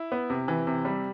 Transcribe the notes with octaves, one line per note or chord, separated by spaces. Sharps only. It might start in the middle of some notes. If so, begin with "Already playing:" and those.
Already playing: E4
B3
C3
E3
C3
G3